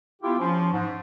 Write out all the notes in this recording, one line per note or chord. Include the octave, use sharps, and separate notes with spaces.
B3 E4 F4 G4
F3 C#4
G#2